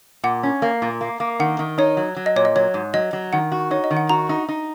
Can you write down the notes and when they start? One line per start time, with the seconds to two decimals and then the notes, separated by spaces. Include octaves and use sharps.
0.24 A#2 F#5
0.43 C#4
0.62 A#3
0.82 A#2
1.01 A#3
1.20 A#3
1.39 D#3 F#5
1.59 D#3
1.78 D#4 C#5
1.97 F#3
2.16 F#3
2.26 D#5
2.36 A#2 C#5
2.45 D#5
2.56 F#3 C#5
2.74 G#2
2.94 F#3 D#5
3.13 F#3
3.33 D#3 F#5
3.52 F#4
3.71 D#4 C#5
3.84 D#5
3.91 D#3
3.97 F#5
4.09 F#4 A#5
4.29 D#4
4.49 D#4